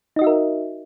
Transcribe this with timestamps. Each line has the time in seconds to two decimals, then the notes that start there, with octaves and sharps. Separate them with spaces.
0.16 D#4
0.19 D#5
0.22 F#4
0.24 E5
0.27 A#4